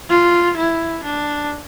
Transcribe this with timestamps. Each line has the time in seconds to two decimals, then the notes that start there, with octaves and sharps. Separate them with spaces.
0.10 F4
0.57 E4
1.03 D4